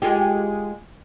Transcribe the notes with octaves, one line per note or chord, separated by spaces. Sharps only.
G#3 F4 G4